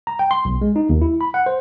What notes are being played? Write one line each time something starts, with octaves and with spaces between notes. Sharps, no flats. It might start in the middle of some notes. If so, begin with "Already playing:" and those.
A#5
G5
C6
B1
G#3
D#4
D#2
E4
B5
F#5
C5